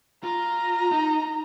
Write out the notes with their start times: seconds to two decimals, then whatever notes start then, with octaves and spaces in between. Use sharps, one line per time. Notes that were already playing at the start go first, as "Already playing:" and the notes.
0.23 F4 A#5
0.92 D#4